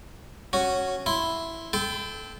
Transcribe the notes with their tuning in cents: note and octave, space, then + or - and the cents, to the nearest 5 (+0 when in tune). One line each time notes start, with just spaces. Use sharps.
C#4 -5 F#4 +0
E4 +0 C6 +0
A4 -20 G5 +0 B5 +45